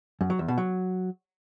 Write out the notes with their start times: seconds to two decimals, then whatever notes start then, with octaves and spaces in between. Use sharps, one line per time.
0.21 F#2
0.30 F#3
0.39 E2
0.48 B2
0.58 F#3